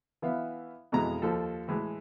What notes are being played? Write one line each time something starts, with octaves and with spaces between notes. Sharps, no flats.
E3 B3 E5 F5
F2 B2 E3 G#3 A#5
D#2 F3 A4
A2 E3 G#3